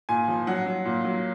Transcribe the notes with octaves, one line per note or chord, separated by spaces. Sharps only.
A#2 G#5
F3
F#3 F#5
F#3
A#2
F#3